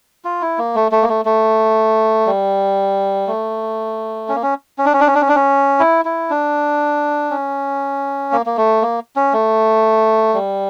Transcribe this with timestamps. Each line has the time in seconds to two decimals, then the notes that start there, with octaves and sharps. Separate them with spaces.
0.25 F4
0.42 E4
0.58 A#3
0.75 A3
0.92 A3
1.03 A#3
1.09 A3
1.25 A3
2.27 G3
3.27 A3
4.29 C#4
4.35 A#3
4.43 C#4
4.78 C#4
4.86 D4
4.93 C#4
5.01 D4
5.07 C#4
5.15 D4
5.21 C#4
5.29 D4
5.36 C#4
5.80 E4
6.05 E4
6.30 D4
7.31 C#4
8.32 A#3
8.46 A#3
8.57 A3
8.82 A#3
9.16 C#4
9.33 A3
10.34 G3